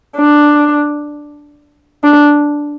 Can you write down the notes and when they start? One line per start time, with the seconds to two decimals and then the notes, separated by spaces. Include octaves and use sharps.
0.16 D4
2.04 D4